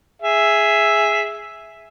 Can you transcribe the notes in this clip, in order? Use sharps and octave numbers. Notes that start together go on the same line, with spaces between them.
G#4 E5